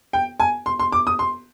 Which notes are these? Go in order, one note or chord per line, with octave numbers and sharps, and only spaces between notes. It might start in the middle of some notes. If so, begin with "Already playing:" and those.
G5
G#5
C6
C6
D6
D#6
C6